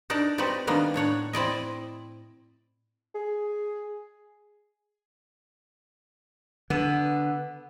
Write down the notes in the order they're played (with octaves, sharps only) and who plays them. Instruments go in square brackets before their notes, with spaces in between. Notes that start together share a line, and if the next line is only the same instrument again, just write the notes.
[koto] D4 D#4 A#4 D5 A5
C4 D#4 F#4 G4 B4 D5
D#3 G3 A#3 B3 D4
A2 D4 C#5 F#5
C4 E4 D5 D#5
[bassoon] G#4
[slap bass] D3 [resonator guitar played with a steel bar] B3